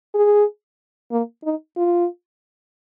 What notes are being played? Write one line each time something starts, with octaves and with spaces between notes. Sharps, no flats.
G#4
A#3
D#4
F4